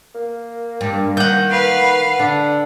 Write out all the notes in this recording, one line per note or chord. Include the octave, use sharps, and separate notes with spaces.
A#3
G2
D#3 F#5 G6
B4 F5
D3 D4